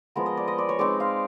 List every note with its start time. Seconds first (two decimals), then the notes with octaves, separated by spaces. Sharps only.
0.16 F3 G#3 B3 A#4
0.26 D#5
0.37 D5
0.48 D#5
0.58 D5
0.69 C#5
0.79 G#3 C4 D#4 D5
1.00 F5